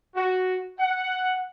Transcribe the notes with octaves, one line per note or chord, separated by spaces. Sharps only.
F#4
F#5